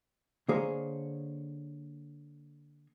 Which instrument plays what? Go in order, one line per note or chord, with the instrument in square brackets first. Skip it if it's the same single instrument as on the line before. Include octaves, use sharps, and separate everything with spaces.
[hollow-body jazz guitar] D3 A#3 G#4 C5 C#5